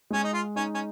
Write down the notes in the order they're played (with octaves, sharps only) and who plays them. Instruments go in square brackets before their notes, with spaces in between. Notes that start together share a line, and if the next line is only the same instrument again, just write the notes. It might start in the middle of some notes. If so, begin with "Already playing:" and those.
[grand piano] G#3 [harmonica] C#4
[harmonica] D#4
F4
[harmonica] C#4 [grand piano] D#4
[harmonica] C#4